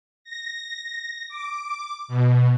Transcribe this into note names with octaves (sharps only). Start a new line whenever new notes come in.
A#6
D6
B2